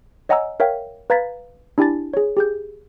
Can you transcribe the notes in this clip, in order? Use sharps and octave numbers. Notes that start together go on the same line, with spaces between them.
C#5 D#5 F#5 G#5 A#5 E6
A#4 C#5 E5 F5 G5
B4 F5 A#5 G#6 A6 B6
D4 E4 G4 G#5 A5 A6
G#4 C#5
G4 G#4 G6